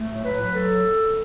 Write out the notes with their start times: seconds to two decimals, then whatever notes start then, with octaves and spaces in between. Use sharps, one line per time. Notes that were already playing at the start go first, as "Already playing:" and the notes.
Already playing: A3
0.08 A2
0.24 F#3 B4
0.40 F#3
0.55 A4